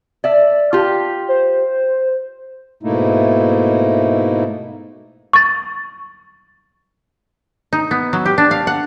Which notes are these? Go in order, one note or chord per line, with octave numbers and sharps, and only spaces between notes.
D5 E5
F4 G4
C5
G#2 B2 A3 A#3 D#4 E4
C#6 A6
D#4
B3
F#3
G4
D4
F5
F#5